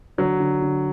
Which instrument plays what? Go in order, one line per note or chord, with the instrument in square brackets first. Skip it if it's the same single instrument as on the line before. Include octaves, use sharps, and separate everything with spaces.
[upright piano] D3 [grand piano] F#3
[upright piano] D3
D3